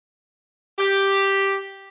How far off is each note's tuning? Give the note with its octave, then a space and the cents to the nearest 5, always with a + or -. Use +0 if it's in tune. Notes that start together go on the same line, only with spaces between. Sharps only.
G4 +0